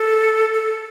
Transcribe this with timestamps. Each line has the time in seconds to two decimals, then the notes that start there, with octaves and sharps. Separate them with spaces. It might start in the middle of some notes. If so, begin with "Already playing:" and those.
Already playing: A4
0.54 A4